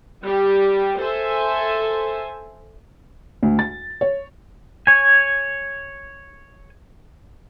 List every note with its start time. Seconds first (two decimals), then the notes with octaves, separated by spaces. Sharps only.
0.23 G3 G4
0.99 A4 C5 E5 G#5
3.43 D2
3.59 A6
4.01 C#5
4.87 C#5 G#5